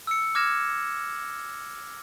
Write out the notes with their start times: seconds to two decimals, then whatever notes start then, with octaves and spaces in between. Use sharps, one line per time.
0.07 E6 C#7
0.35 D6 F6 G#6 A#6 E7